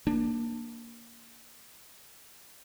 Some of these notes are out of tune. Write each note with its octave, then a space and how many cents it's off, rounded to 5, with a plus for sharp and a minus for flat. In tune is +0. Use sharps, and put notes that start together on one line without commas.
A#3 +0 D4 +20